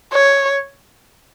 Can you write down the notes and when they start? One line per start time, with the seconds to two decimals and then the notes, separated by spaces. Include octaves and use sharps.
0.13 C#5